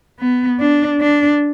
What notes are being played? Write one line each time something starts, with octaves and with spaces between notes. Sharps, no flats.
B3
D4
D4